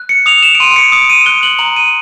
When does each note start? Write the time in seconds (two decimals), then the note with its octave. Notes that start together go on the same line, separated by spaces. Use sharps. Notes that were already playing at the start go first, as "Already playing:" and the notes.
Already playing: F#6
0.09 C#7
0.26 D#6 F7
0.43 E7
0.55 D7
0.60 C6 D#7
0.76 C#7
0.92 D#6 D7
1.10 D#7
1.26 F#6 G7
1.43 F#7
1.59 A#5 F#7
1.76 D#7